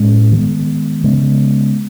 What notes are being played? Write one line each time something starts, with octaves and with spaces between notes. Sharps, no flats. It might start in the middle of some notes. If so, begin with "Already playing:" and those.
Already playing: A2 G#3 C#4
D#3 G#3 B3
C#3 G#3 B3